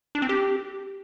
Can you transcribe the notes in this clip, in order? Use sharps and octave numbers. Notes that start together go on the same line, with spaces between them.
D4
C4
G4